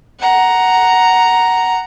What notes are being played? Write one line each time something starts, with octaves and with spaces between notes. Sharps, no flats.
F#5 A#5